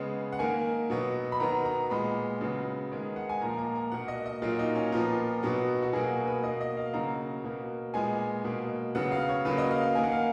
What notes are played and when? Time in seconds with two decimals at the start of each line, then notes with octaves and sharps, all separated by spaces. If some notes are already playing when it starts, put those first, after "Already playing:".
Already playing: C#3 G#3 B3
0.32 F#5
0.39 D#3 A#3 G#5
0.90 B2 F#3 B3
1.32 B5
1.40 D#3 F#3 B3 A#5
1.65 A#5
1.90 A#2 G#3 B3 B5
2.41 C#3 F#3 B3
2.92 D#3 G#3 B3
3.16 F#5
3.29 G#5
3.41 A#2 F3 A#3 A#5
3.58 A#5
3.75 A#5
3.92 B2 A#3 F#5
4.08 D#5
4.26 D#5
4.42 A#2 F#3 A#3 F4
4.59 D#4
4.75 C#4
4.92 A#2 F3 B3 A#4
5.43 B2 F#3 B3
5.82 F#4
5.93 B2 F#3 A#3 G#4
6.27 B4
6.43 B2 A#3 D#5
6.61 D#5
6.77 F5
6.94 C#3 F#3 A#3 A#5
7.44 B2 A#3
7.94 A#2 G#3 B3 G#5
8.44 B2 A#3
8.95 C#3 F#3 B3 F#5
9.12 F5
9.29 C#5
9.45 C#3 F#3 A#3 B4
9.58 D#5
9.71 F5
9.83 F5
9.95 D#3 A#3 G#5
10.03 F#5
10.12 F5